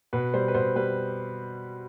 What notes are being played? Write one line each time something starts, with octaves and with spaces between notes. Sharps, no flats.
B2 B4
G3 C5
B4
B2 C5
G3 B4